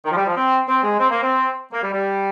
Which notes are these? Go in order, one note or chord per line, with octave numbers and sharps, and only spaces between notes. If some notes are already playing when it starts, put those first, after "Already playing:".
D#3
F3
G3
F3
C4
C4
G#3
C4
A#3
C4
A#3
G3
G3